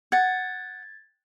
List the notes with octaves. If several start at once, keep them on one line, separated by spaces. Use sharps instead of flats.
F#5 G#6 A6